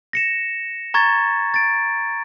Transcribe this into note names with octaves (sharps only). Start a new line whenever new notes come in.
A#6 C#7 E7
A#5 C#6 G#6 A6
A6 D7